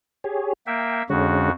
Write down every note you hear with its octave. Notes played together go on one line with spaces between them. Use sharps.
G4 G#4 C#5
A#3 E5 G5
F2 D3 G#3 C#4 F#4